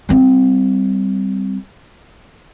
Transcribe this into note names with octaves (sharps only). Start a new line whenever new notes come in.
G3 C4